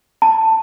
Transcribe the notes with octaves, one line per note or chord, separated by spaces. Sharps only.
A5